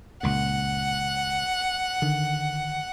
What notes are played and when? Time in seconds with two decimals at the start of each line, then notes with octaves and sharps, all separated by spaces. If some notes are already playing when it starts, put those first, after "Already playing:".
0.23 C#2 A#2 F#5
2.02 D3 D#3